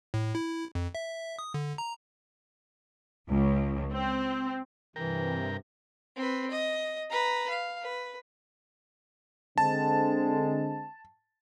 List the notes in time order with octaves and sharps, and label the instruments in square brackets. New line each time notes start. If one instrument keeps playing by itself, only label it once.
[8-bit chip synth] A2
E4
F2
E5
D#6
D3
A#5
[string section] C#2
C4
[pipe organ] G2 C3 [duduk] E3 [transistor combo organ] A#4 G5
[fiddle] C4 B4
D#5
B4 A#5
F5
B4
[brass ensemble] D3 G#3 C4 [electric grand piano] A5